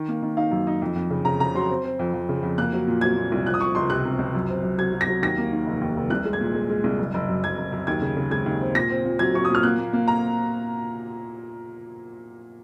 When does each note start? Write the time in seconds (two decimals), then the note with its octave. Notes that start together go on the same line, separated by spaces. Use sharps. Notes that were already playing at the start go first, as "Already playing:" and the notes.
Already playing: D#3
0.08 A#3
0.23 D#3
0.37 D#4 F5
0.51 F#2
0.67 D#4
0.82 F2
0.95 F2
1.10 C#3
1.25 C#3 A#5
1.40 C#3 A#5
1.55 F#3 C6
1.69 C4
1.84 C4
1.99 F2
2.14 F2
2.29 C#3
2.43 F2
2.58 A#3 F#6
2.73 F#3
2.87 A#2
3.01 F#3 G#6
3.16 A#2
3.32 C2
3.46 F3 F#6
3.54 D#6
3.60 F3 C#6
3.75 C#2 C6
3.90 C3 F#6
4.05 C3
4.19 C#2
4.35 F#2
4.49 C4
4.63 F#2
4.78 F#3 G#6
4.93 F#3
5.01 A#6
5.08 F#3
5.22 D#2 A#6
5.38 A#3
5.52 D#3
5.66 F1
5.81 D#2
5.96 F1
6.10 C2 F#6
6.25 G#3
6.33 G#6
6.41 A#2
6.55 G#3
6.70 G#3
6.84 C2
6.99 F#1
7.14 F#1
7.29 F#2
7.43 F#2 G#6
7.58 F#1
7.72 F#2
7.87 D#2 G#6
8.01 C#3
8.17 C#3
8.31 G#3 G#6
8.46 D#2
8.61 C4
8.75 A#2 A#6
8.90 C4
9.05 A#2
9.19 F#3 G#6
9.34 F#3 C#6
9.45 A#2 D#6
9.55 F6
9.63 A#3 F#6
9.78 A#3
9.93 A#3
10.08 A#5